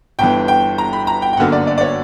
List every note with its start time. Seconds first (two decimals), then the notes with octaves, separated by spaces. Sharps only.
0.19 G1 G2 E3 G5
0.48 G5
0.78 A#5
0.93 B5
1.07 A#5
1.22 G5
1.33 G5
1.37 G1 F#2 D3 A#3 F#5
1.52 D5
1.67 D5
1.78 D5
1.81 C#5